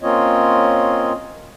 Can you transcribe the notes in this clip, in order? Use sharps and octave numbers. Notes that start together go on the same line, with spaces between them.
A#3 C4 C#4 F4 C#5 D#5